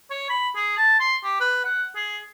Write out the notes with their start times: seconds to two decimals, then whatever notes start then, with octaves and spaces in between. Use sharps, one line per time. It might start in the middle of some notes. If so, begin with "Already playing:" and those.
0.11 C#5
0.30 B5
0.56 G#4
0.77 A5
1.00 C6
1.24 G4
1.40 B4
1.64 F#5
1.96 G#4